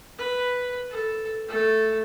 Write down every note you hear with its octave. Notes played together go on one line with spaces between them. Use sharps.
B4
A4
A3 A4